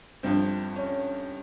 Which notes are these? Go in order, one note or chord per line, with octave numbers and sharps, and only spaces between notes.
G1 G2 F3 C4
C#4